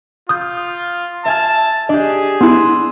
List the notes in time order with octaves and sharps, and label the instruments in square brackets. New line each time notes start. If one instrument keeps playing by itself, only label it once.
[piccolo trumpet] F4 [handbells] D#6 G6
[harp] E5 G#5 F6 [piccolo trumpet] A5
[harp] D4 G4 [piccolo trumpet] G#4 [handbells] D#5
[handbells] B3 E4 [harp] C6 E6 F#6